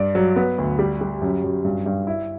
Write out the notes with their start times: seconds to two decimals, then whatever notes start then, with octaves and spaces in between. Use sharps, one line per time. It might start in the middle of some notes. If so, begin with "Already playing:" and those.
Already playing: G2 D5
0.15 F#3
0.36 B3
0.58 D2
0.79 G3
1.01 G3
1.22 F#2
1.44 F#2
1.65 G2
1.86 G2
2.07 E4